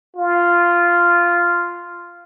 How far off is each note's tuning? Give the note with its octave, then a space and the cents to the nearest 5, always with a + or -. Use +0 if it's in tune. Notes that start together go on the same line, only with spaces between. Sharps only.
F4 -5